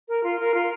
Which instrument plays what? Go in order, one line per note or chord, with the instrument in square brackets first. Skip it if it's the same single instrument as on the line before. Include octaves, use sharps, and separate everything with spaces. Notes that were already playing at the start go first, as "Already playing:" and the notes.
[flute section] A#4
F4
A#4
F4